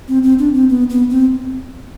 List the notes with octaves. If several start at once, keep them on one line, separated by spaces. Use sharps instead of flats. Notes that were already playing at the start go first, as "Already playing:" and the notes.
C4
C4
D4
C4
B3
B3
C4